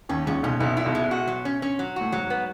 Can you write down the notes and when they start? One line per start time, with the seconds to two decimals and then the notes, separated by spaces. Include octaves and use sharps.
0.09 D#2 D#3 C#4
0.27 C#2 C#3 C#4
0.43 B1 B2 C#4
0.60 B1 B2 E4
0.77 E4
0.85 B1 B2
0.95 G#3
1.11 F#4
1.27 F#3
1.45 C#4
1.62 C#4
1.79 F#3
1.96 A2 F#4
2.12 G#2 F#3
2.30 B3